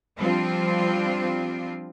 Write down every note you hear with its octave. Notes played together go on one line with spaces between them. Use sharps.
F3 G3 C4 D4 F4